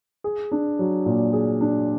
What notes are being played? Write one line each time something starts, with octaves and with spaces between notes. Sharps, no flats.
G#4
D4
F#3
A#2
G#4
D4